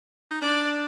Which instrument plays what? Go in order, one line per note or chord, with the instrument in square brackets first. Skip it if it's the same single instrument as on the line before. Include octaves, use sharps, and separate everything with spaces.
[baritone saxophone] D#4
[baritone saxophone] D4 [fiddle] D5